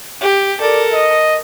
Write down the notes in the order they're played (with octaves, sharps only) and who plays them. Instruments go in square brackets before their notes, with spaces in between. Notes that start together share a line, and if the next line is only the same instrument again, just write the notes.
[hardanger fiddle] G4
[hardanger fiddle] A4 A#4 [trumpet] D5
[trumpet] D#5